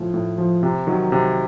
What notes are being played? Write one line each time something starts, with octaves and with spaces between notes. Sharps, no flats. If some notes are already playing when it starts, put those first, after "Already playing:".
Already playing: A2 F3
A2
F3
C3
D#3 F#3
C3